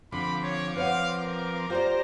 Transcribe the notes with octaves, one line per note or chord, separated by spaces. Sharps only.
D3 F3 C4 B5 D6
C#5
B4 C#5 F5 F#5
A#4
F4 G4 C5 D5 A#5